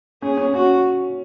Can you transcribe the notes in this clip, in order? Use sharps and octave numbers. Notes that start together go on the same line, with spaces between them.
C#4 G#4
C#4
C#4 F#4